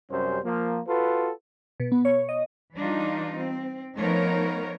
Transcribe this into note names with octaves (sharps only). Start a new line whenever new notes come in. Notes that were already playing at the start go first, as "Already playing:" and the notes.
F#2 C3 G3 C#4 C5
F3 A#3
F4 F#4 A4 B4
B2
B3
C#5
D#5
E3 G3 D4 D#4 F4
C4
F3 A3 B3 D#4 A#4 C#5